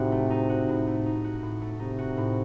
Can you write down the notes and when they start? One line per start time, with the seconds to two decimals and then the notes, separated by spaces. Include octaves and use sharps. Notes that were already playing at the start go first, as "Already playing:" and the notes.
Already playing: A2 C3 D#4 F#4
0.12 A3
0.30 D#4
0.50 F#4
0.68 A2
0.87 A3
1.06 D#4
1.24 F#4
1.42 A2
1.61 A3
1.79 C3 D#4
1.99 F#4
2.17 A2